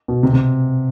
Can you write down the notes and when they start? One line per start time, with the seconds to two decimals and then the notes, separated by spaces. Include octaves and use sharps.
0.08 B2
0.23 C3
0.33 C3